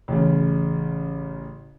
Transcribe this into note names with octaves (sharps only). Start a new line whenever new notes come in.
A1 C#3